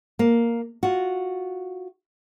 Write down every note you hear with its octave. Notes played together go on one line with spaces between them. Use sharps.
A#3
F4 F#4